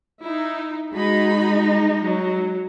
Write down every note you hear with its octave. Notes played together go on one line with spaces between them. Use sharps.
D#4 E4
G#3 D#4 F#4 G#4 B5
F#3